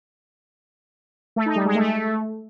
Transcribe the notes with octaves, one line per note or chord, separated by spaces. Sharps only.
A3
D#4
G3
G#3
A3